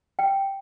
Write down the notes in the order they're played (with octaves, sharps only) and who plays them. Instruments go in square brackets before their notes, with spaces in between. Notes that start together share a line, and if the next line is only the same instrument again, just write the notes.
[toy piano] G5